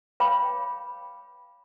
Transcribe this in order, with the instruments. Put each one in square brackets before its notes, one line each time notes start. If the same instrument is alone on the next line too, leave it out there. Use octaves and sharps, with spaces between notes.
[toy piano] B4 C#5 F5 G5 B5 D6